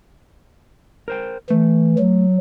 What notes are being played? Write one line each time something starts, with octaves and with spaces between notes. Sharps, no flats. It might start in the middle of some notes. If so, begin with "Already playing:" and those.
A#4 C5 G5
E3 A3
F#3